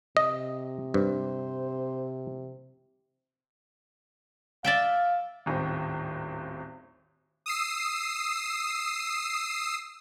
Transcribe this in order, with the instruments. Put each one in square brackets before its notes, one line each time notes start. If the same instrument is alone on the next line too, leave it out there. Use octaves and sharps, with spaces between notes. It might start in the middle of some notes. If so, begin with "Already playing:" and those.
[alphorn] C3 [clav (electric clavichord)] D#5
[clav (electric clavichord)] G2 [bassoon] C5
[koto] D5 E5 G5 [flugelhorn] F5
[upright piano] D#1 G#1 A2 C5
[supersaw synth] D#6 E6 C7